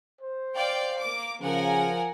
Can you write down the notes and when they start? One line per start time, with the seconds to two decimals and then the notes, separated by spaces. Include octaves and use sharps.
0.21 C5
0.55 D5 F5 G5
1.00 A#3 D6
1.41 C#3 F3 A#4 F#5 G#5